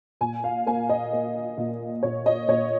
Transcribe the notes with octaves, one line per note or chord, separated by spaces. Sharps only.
A#2 G#5
F5
A#3 G#5
D#5
A#3
A#2
A#2 C#5
D#5
A#2 C#5